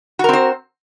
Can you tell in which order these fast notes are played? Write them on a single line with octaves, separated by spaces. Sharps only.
F#4 A#4 C4 C5